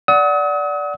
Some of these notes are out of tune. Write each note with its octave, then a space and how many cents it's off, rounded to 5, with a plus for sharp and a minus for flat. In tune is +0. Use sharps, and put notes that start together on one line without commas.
D5 -10 F#5 +0 D#6 +40